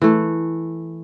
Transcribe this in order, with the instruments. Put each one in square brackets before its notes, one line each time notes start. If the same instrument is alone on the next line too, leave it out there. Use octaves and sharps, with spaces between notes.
[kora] E3 A3